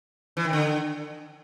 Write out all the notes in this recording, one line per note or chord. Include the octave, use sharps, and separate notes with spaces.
E3
D#3
D3